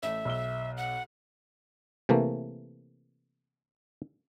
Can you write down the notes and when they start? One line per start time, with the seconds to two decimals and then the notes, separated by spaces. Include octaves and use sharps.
0.03 A1 A3 E5
0.25 B1 E6 G7
0.77 F#5
2.09 C3 E3 A3 A#3